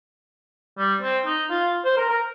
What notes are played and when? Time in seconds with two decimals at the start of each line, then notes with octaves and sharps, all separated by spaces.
0.78 G3
1.02 C4
1.26 D#4
1.50 F4
1.85 C5
1.97 A#4
2.09 A#4